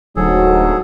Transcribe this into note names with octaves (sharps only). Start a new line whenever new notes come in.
D1 G#2 F#3 G#4 A4